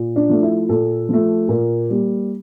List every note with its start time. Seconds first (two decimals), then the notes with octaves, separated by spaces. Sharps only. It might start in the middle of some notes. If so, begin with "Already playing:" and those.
Already playing: A#2
0.16 D4
0.29 F3 A3
0.43 E4
0.69 A#2 A4
1.09 F3 A3
1.48 A#2 A#4
1.89 G3 A#3